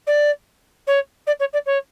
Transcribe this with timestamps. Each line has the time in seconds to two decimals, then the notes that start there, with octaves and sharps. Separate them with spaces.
0.07 D5
0.87 C#5
1.27 D5
1.40 C#5
1.53 D5
1.66 C#5